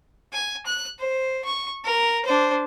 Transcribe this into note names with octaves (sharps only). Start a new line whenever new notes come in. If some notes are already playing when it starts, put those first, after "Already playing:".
G#5
F#6
C5
C#6
A#4
D4 C5